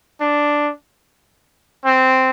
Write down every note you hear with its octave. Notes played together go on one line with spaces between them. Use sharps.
D4
C4